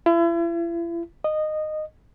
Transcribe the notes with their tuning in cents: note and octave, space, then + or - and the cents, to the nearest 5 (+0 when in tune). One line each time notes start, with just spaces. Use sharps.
E4 +40
D#5 -15